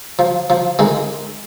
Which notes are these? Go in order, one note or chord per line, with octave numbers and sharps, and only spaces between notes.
F3
F3
D#3 G#3